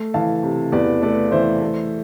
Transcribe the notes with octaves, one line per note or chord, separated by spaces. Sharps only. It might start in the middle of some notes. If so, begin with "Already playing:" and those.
Already playing: A3
E3 F5 A5
C3
E2 B4 D5
A3 B4 D5
E3 C5 E5
A3